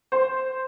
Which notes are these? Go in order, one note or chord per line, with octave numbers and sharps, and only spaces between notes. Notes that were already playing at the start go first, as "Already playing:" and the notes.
C5